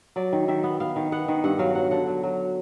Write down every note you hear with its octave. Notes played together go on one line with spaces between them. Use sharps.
F#3 D5
D#3
D#3 E5
B3
B3 F5
D#3
B3 F#5
D#3
G2 F#5
F#3 F5
F#3 F#5
D3 F#5
F#3
F#3